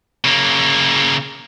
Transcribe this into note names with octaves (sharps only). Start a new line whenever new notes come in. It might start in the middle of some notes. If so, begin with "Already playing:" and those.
C#3 A#3